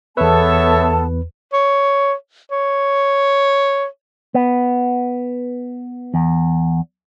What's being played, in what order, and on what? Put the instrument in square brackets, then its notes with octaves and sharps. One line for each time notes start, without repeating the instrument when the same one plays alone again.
[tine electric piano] E2 B4 [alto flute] B3 [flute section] A4 A5 [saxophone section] C#5 E5
[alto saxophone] C#5
C#5
[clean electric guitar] B3
E2